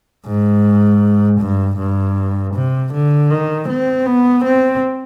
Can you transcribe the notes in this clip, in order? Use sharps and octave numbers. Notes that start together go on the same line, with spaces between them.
G#2
G2
G2
C3
D3
D#3
C4
B3
C4